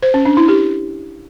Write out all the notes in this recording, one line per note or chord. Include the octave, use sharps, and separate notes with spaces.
C5
C#4
D4
E4
G4